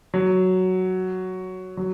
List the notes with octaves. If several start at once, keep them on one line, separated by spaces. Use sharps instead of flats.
F#3
F#3